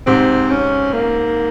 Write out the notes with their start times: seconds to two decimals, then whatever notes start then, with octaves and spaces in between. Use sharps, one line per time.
0.06 G#2 C3 C4
0.50 C#4
0.93 A#3